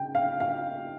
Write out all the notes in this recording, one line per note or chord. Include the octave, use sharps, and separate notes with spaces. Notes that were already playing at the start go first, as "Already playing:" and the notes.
Already playing: C#3 G5
F5
F5